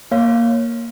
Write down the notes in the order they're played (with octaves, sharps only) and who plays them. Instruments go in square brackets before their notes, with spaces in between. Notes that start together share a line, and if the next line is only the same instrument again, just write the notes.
[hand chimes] A#3 C#5 F5